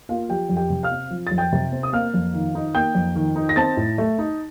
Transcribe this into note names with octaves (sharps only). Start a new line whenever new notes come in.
A#3 F4 F5
F3 G4 G5
F2
G4 G5
C3
F5 F6
C4
F3
F2 A6
G5 G6
C3
C4
D#6
A#3 F5 F6
F2
D#3
D#4
A#3 G5 G6
F2
D#3
D#4
A#6
C4 A5 A6
A2
A3
D#4